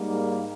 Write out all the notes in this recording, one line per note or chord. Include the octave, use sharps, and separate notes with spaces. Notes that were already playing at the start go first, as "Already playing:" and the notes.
Already playing: G#2 G3 A#3